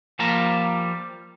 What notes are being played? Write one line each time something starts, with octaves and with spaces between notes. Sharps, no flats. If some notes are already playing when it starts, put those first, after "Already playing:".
F3 G3 A#3 A5 A#5